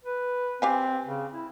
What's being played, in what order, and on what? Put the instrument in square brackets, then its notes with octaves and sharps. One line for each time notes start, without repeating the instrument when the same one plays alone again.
[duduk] B4
[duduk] C4 [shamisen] G4 F5 G#5
[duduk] C#3
E4